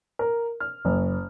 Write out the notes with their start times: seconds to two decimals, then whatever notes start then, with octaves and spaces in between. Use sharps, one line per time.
0.19 A#4
0.60 F6
0.85 F#1